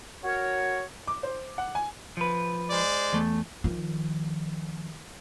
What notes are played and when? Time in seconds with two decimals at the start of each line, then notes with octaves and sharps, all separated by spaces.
0.24 F#4 A#4 C#5
1.07 D6
1.23 C5
1.58 F#5
1.75 G#5
2.17 F3 B4
2.70 G#3 C5 D5
3.13 E2 A3
3.64 D#3 F3